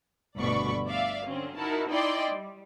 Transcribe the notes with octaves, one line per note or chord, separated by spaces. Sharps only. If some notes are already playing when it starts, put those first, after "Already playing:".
G1 D2 B2 D5 B5 C#6
D5 E5 F5
D3 F#3 C4 C#4
D#4 E4 F#4 A#4 A5
D#4 E4 D5 D#5 G5 C6
G3